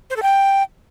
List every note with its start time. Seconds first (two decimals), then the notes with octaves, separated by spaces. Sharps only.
0.10 C5
0.16 A4
0.22 G5